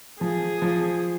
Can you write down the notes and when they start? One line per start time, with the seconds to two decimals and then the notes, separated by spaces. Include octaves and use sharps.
0.21 F3 G#4
0.62 F3